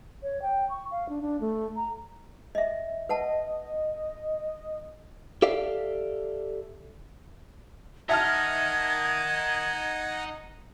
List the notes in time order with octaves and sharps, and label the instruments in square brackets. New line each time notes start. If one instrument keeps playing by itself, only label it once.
[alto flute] C#5
G5
C#6
F5
D4
D4
A3
A#5
[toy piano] D#5 E5
[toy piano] B4 F#5 A5 [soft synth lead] D#5
[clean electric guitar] G4 A4 D5 E5 F5
[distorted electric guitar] D#4 A#4 [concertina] D#5 F#5 [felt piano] E5 A5 F6 [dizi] G#6